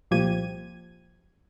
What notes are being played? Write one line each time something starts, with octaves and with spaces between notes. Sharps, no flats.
C2 A#2 F3 G4 G#6 D#7